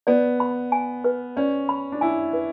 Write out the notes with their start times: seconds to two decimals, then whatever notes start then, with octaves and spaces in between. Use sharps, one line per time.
0.07 B3 D5
0.40 B5
0.72 G#5
1.04 B4
1.37 C#4 D5
1.69 B5
1.92 D4
2.01 E4 G#5
2.33 B4